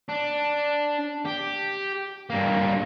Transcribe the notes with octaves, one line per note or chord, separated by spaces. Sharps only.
D4
G4
G2 A#3